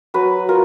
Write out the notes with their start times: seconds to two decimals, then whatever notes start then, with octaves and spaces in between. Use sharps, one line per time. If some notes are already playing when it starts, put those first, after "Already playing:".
0.14 F#3 B4
0.49 F4 A#4